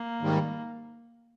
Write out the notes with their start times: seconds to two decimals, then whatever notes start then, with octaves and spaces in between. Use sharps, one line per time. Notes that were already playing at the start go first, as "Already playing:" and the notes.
Already playing: A#3
0.21 G#2 D#3 G3